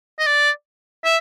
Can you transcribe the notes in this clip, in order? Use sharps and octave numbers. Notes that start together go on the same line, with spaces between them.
D#5
D5
E5